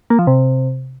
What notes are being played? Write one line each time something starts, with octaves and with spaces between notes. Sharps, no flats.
A#3
F3
C3